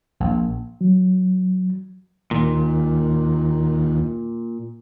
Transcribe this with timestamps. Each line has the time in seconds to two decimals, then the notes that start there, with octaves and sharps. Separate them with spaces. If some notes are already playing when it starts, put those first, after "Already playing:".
0.20 A#1
0.81 F#3
2.31 D#2 A#2